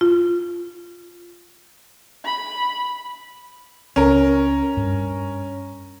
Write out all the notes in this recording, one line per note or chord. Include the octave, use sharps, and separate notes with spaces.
F4
B5
C#2 C#4 A#4
G2